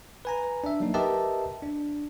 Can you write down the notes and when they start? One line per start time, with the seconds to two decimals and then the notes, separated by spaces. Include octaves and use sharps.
0.25 B4 G#5 A#5
0.64 D4 E5
0.80 F#3 A#3 D#4
0.94 G4 A#4 B4 D#5 E5 A5
1.62 D4